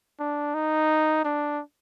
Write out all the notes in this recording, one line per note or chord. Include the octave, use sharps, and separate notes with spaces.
D4
D#4
D4